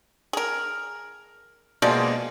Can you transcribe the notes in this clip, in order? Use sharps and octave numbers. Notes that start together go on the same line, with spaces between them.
G#4 A#4
B2 F3 G#3 A#3 G#4 D5